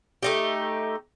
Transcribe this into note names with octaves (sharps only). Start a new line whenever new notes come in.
A3 D#4 G4